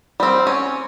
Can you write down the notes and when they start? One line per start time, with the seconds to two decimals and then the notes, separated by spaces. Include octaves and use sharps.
0.20 G3 C4
0.47 C#4